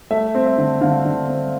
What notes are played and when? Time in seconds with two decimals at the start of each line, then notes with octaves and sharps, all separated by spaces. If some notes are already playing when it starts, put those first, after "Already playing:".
0.10 A3 E5
0.35 C4
0.46 E5
0.58 D3
0.81 D3 F5
1.06 D3
1.29 C4